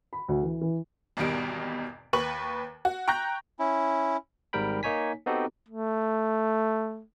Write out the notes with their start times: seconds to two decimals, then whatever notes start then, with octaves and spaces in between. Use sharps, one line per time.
0.13 B5
0.28 D2
0.43 E3
0.61 E3
1.17 G#1 E2 B2 D#3 G3 D7
2.13 D#2 B4 C#6 F#7
2.85 F#4
3.08 G5 A#5 C#6 F#6 G6 A#6
3.59 C#4 E4
4.53 G#1 G#2 G3 A#4 G5 B5
4.83 A#3 D#4 C#5 G#5 B6
5.26 B3 C4 D#4 F#4 G4 A4
5.69 A3